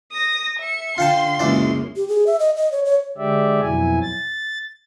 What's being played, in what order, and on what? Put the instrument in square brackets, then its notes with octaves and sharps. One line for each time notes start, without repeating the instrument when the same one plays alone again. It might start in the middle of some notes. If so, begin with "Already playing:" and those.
[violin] D#6 A#6
E5 C#7
[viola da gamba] D3 [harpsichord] F4 G5 A5 [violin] C6
[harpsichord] C#2 E3 D5 [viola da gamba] F#2 G#3 A#3
[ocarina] G4
G#4
E5
D#5
D#5
C#5
C#5
[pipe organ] D3 G#3 G4 D5 E5
F2 B2 F#3 E4 G#5
A6